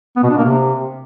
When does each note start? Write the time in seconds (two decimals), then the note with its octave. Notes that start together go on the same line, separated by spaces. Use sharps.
0.16 B3
0.23 B2
0.30 D4
0.37 A#3
0.44 C3